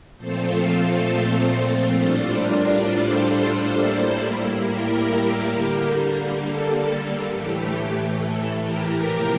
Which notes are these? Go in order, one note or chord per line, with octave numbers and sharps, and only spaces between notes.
A#2 F3 A3 C4 F4 A4 C5
A2 G3 D4 F4 A4 C5
A#4 D5
A4 C5
A2 G3 A#3 E4
G4 A#4
D3 G3 A#3
A4
A2 E3 A3 G4
A4
G4 A#4
C3 F3 A#3